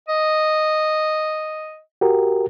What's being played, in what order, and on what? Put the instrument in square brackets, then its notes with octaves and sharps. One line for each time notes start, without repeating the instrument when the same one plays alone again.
[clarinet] D#5
[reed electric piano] F#4 G4 A#4